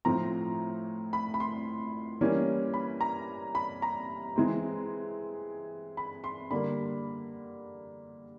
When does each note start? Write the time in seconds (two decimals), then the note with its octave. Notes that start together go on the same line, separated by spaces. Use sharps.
0.05 A2 F3 A3 C4 A#5
1.13 B5
1.34 B5
1.40 C6
2.21 E3 G3 A#3 C#4
2.74 B5
3.01 A#5
3.55 B5
3.82 A#5
4.36 E3 G#3 C4
5.97 B5
6.24 C6
6.51 D3 G3 A#3 B5